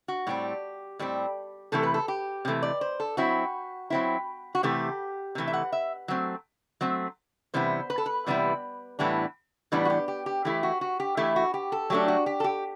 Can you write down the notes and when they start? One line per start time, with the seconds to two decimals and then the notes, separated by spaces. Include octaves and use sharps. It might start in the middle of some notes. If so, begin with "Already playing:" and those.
0.08 F#4
0.27 A2 G3 C4 G4
0.99 A2 G3 C4
1.72 C3 E3 A3 A4
1.83 B4
1.94 A4
2.08 G4
2.45 C3 E3 A3
2.63 D5
2.81 C5
3.00 A4
3.17 F#3 C4 E4 F#4
3.90 F#3 C4 E4
4.55 F#4
4.63 C3 E3 A3 G4
5.35 C3 E3 A3
5.48 E5
5.53 F#5
5.72 E5
6.08 F#3 A3 C4
6.81 F#3 A3 C4
7.54 C3 E3 G3 B3 E4 C5
7.90 B4
7.98 A4
8.06 B4
8.27 C3 E3 G3 B3 E4
8.99 A2 E3 G3 B3 D4
9.72 A2 E3 G3 B3 D4 B4
9.85 F#4
9.90 G4
10.08 G4
10.26 G4
10.45 E3 A3 E4 G4
10.63 F#4
10.81 F#4
11.00 G4
11.17 E3 A3 E4 G4
11.36 F#4
11.54 G4
11.72 A4
11.90 F#3 A3 D4 G4
12.08 F#4
12.26 G4
12.40 A4
12.44 G4